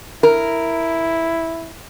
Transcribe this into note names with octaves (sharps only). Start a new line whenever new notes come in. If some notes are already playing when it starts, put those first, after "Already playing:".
E4 A#4